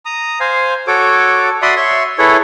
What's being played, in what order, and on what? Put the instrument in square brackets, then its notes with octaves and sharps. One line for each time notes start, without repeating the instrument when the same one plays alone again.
[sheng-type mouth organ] A#5 D#6
C5 F5 G#5
F#4 A4 C#5 D6
F#4 D5 E5 B5 C6 D#6
C#5 E5 C6 C#6
E4 G#4 A4 B4 C#5